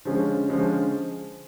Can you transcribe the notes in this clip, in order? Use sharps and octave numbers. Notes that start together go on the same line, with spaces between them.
D3 F3 G#3 C#4
D3 F3 G#3 C#4